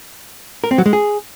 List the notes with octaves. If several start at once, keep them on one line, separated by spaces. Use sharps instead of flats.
A#4
C4
F#3
G#3
G#4